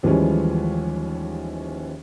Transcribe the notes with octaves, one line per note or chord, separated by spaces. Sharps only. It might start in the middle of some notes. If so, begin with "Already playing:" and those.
D#2 E3 F3 G3 G#3 C#4